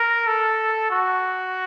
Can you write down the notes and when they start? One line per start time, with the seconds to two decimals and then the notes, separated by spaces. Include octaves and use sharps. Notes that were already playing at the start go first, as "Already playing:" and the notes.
Already playing: A#4
0.27 A4
0.90 F#4